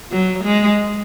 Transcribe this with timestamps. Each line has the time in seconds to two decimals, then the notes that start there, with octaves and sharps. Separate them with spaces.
0.11 F#3
0.45 G#3